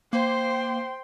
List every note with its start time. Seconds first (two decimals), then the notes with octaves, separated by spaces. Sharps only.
0.13 A#3 C5 G5 C6